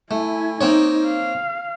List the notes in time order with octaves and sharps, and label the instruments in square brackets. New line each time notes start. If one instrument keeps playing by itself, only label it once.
[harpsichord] A3 [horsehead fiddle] E4 G#5
[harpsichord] A#3 C4 C#5 [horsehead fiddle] D#4
[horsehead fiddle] F5